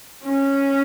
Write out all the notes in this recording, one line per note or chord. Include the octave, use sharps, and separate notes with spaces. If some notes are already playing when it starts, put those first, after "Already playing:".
C#4